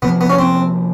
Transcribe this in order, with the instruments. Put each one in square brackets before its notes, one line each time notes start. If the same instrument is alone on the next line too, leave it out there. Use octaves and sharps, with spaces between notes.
[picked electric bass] C3 F3 A#3 [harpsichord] B3
[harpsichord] B3
C#4
C4